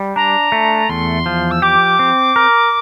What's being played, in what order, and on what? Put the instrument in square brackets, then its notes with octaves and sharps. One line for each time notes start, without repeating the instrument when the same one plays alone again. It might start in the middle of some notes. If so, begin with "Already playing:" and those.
Already playing: [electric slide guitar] G3
[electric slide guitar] D4 [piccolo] A#5
[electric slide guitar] A3
[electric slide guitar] E2 [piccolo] C6
[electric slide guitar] F3
[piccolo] E6
[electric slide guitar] G4 [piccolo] D6
[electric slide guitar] C4
A#4